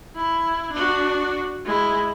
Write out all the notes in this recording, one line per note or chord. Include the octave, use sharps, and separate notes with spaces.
E4
D4 F#4
G#3 E4